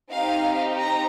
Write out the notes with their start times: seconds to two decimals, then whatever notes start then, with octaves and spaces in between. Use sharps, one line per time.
0.12 C4 D#4 G4 F5
0.78 A#5